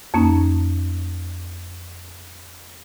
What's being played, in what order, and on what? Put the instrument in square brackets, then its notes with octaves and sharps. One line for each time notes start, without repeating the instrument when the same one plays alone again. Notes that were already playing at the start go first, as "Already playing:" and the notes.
[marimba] F2 A#3 C#4 D#4